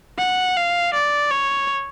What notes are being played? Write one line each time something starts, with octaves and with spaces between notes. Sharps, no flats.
F#5
F5
D5
C#5